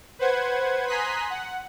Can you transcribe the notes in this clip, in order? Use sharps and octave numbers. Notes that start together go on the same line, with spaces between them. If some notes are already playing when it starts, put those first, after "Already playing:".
B4 C5 F#5 G#6
G#5 A#5 C6 D#6 F#6 B6
F#5